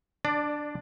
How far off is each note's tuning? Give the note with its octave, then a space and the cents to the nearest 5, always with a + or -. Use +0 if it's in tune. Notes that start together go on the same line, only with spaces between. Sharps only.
D4 +0 D5 +20